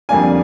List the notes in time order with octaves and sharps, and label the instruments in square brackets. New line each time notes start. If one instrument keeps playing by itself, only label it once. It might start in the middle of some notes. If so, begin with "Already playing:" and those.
[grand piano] F2 D3 G3 A#3 D4 G#5